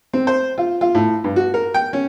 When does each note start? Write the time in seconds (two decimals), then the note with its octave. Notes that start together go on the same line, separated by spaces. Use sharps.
0.14 C4
0.27 C5
0.58 F4
0.81 F4
0.95 A2
1.24 G2
1.36 F#4
1.54 A#4
1.74 G5
1.93 C#4